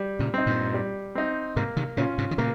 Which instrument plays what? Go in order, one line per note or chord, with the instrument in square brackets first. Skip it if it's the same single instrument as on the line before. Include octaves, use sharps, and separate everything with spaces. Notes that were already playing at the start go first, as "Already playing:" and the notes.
Already playing: [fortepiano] G3
[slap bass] A#2 C#3
[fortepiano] C4 D#4
[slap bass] G2 A#2
[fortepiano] G3
C4 D#4
[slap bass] G#2 C3 [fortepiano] A#3
[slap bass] C3 D#3
[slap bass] A#2 C#3 [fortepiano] C#4 F4
[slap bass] G#2 C3
D#3
[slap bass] A#2 C#3 [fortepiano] A#3